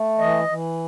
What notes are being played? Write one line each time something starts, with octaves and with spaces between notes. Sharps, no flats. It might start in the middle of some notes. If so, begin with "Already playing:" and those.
Already playing: A3
E3 D#5
E3